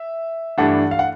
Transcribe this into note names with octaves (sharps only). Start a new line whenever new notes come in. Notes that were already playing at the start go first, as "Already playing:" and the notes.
Already playing: E5
G2 E3 A3 D4 F#5
F5
F#5